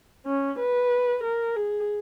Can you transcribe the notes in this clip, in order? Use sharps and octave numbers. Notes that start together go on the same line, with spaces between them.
C#4
B4
A#4
G#4